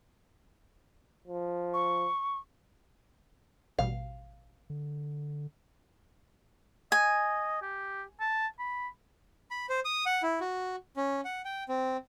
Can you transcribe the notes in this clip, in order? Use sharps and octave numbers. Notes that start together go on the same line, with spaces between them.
F3
C#6
A1 B2 G3 F5
D3
D#5 G#5
G4
A5
B5
B5
C5
D#6
F#5
E4
F#4
C#4
F#5
G5
C4